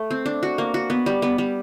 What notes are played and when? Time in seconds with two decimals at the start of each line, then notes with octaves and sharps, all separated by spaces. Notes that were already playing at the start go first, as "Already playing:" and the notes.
Already playing: A3
0.11 C4
0.26 D4
0.43 F#4
0.58 A#3
0.74 F#4
0.90 B3
1.06 G3
1.22 B3
1.38 G3